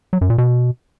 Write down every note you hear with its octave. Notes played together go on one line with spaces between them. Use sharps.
F#3
F#2
A#2
B2